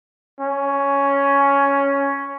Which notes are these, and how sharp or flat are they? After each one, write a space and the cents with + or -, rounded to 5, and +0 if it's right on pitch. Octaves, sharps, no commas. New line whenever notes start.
C#4 +5